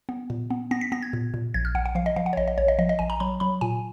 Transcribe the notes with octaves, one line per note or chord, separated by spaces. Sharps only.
B3
A#2
B3
B3 A#6
B6
B3 A#6
G#6
A#2
A#2
A#1 G#6
F6
A#1 F#5
F#5
F3 F5
D#5
F3 F5
F#5
C#5
A#1 D#5
D#5
A#1 C#5
D#5
F3 D#5
D#5
A#1 G#5
A#5
F#3 B5
F#3 B5
A#2 G#5